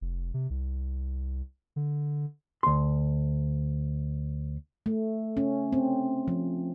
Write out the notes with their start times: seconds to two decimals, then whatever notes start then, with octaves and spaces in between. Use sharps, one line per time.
0.01 F1
0.34 C3
0.50 C2
1.76 D3
2.63 D2 C6
4.86 A3
5.37 C#4
5.73 C4
6.28 F3